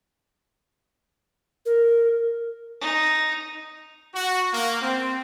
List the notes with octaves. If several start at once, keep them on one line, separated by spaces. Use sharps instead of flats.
A#4
D#4
F#4
A#3
C4